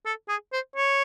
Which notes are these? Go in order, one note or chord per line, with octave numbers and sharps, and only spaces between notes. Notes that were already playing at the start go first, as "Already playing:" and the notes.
A4
G#4
C5
C#5